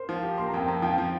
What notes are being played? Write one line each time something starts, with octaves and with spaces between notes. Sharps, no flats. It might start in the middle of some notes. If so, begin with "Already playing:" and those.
Already playing: A#4 C5
F3
G4
A#3 C6
A#5
F2 G5
F2 A#5
F3 G5
F3